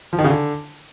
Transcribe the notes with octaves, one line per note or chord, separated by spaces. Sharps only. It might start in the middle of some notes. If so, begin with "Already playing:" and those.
F3
D#3
C#3
D3